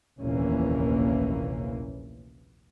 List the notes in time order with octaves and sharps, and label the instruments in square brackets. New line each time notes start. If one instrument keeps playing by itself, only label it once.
[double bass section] F1 A#1 D#2 E3 A#3 C#4